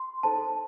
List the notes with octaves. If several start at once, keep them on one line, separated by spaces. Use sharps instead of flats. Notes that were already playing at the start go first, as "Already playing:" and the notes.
Already playing: C6
D#4 A4 C5 A5